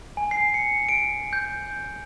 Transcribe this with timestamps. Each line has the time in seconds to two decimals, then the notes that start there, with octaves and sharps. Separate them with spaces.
0.17 G#5
0.31 C7
0.54 C#7
0.89 D7
1.33 G6